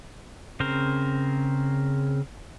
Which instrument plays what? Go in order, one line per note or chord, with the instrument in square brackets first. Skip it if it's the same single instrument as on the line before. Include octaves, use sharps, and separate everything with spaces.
[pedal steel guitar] C#3 C4 A#4 C5